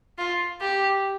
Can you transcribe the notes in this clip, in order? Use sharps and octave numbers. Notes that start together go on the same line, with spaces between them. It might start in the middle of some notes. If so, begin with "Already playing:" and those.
F4
G4